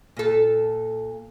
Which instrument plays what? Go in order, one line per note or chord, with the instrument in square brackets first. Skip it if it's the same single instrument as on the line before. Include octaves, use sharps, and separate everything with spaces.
[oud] A#2 A4